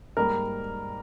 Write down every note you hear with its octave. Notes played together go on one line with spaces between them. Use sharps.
G#2 G3 A#3 A#4